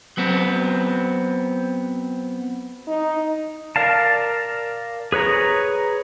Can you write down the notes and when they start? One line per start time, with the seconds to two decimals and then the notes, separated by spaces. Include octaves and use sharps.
0.17 F#3 B3 C4
2.87 D#4
3.76 A#4 D5 F5 A5
5.12 G#4 B4 C#5 A#5